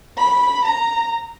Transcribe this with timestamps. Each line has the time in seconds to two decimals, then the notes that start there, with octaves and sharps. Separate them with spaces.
0.18 B5
0.65 A#5